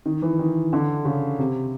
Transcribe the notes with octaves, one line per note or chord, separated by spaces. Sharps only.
D#3
E3
D#3
D3
C#3
C3